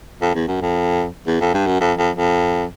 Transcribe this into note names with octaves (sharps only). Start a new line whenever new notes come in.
F2
E2
F#2
F2
E2
F2
G2
F#2
F2
F2
F2